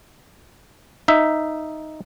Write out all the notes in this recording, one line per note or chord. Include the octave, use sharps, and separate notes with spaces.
D#4 E5